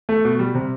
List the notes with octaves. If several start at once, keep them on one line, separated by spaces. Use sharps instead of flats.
A3
B2
G3
C3